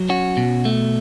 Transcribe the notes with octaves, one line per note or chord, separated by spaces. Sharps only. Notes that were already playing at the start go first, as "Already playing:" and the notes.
Already playing: F#3
C#4 F#4
B2
A3